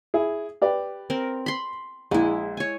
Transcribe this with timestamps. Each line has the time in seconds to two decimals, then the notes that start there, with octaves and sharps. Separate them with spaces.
0.14 E4 G#4
0.62 G4 B4 D5
1.10 C4 A#4
1.46 B5 C6
2.11 A#1 G#3 E4
2.57 C#5 G#5